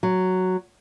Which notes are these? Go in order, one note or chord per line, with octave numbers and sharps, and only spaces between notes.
F#3